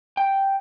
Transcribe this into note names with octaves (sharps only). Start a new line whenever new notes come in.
G5